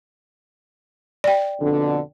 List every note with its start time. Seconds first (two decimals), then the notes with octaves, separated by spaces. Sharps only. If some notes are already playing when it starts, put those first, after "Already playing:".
1.24 D5 G5
1.60 F2 B2 D3